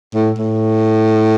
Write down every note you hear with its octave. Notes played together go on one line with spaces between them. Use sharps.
A2
A2